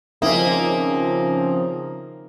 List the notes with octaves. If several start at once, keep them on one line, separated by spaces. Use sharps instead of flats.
C#3 F3 A#3 C4 D#4 E5 G#5 D#6